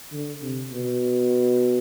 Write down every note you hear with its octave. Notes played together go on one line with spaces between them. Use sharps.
D3
C3
B2